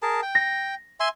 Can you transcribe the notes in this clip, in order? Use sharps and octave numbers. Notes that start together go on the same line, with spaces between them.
G#4 A#4 A5
G5
A#6
E5 G#5 C6